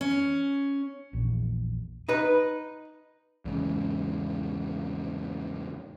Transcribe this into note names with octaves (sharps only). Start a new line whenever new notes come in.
C#4
A#1 E2 A#2
D#4 B4
E2 G#2 C#3